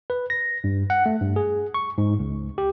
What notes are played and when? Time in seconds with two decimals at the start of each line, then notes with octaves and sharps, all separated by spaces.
0.10 B4
0.30 A#6
0.64 G2
0.90 F#5
1.06 A3
1.21 G2
1.36 G#4
1.74 C#6
1.98 G#2
2.19 C#2
2.58 G4